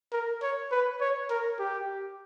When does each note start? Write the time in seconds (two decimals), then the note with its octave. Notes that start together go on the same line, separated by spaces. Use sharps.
0.12 A#4
0.42 C#5
0.71 B4
1.01 C#5
1.30 A#4
1.59 G4